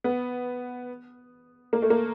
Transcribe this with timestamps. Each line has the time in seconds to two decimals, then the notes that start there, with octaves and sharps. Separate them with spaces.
0.04 B3
1.73 A#3
1.82 A3
1.90 A#3